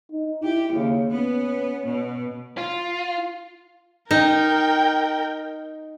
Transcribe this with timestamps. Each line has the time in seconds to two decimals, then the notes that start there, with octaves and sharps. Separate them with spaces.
0.11 D#4
0.44 E4 G4
0.74 D#2 C#3
1.12 B3 C#4
1.86 B2
2.58 F4
4.11 D#4 A#4 G5